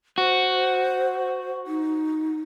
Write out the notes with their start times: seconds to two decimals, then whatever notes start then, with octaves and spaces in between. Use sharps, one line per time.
0.18 F#4 C5
1.67 D#4